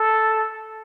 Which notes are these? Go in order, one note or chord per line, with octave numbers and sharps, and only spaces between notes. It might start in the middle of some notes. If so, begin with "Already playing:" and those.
Already playing: A4